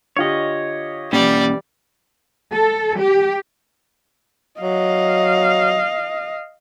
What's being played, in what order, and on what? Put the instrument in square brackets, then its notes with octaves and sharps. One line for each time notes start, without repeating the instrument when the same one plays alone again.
[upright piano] D3 F4 G4 [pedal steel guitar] C#5 D#5
[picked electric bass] B1 A#3 C#4 [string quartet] E3 G3 D5
[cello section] A4
G4
[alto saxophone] F#3 [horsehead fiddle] D#5 F5